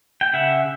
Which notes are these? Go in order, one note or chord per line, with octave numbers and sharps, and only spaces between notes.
G5
C#3 E5 F#5